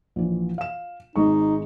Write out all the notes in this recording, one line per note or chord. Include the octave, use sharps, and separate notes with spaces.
A#1 E3
F5 E7
G#1 G#3 D#4 C#6